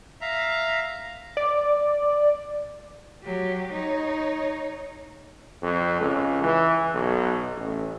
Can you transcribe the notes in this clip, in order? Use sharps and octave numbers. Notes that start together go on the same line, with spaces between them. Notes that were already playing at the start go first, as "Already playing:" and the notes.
E5 F5 A#5
D5
F#3 G4
D#4 C#5
F2
C#2
E3
B1
A1